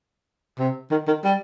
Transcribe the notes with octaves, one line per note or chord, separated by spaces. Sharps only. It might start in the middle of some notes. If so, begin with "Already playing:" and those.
C3
D#3
D#3
G3